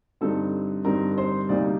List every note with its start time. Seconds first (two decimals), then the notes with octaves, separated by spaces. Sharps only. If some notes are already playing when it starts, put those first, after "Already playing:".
0.21 G2 D3 G3 C4 D#4 A4
0.85 G2 D3 G3 C4 D#4 A#4
1.18 C5
1.49 D2 C3 G3 A#3 D#4 D5